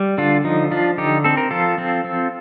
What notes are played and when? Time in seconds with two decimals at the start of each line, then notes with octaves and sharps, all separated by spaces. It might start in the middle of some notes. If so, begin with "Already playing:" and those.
Already playing: G3
0.18 D3 D4 F4
0.44 F3 D#4
0.71 F3 D4 F4
0.98 D3 D#4 G4
1.24 C4 A4
1.37 A#4
1.51 F3 F4 A4
1.78 C4
2.05 C4